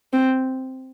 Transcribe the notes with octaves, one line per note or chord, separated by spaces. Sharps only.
C4